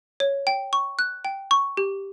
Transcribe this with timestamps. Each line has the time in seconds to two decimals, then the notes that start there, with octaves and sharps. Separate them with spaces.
0.20 C#5
0.47 G5
0.73 C#6
0.99 F#6
1.25 G5
1.51 C#6
1.77 G4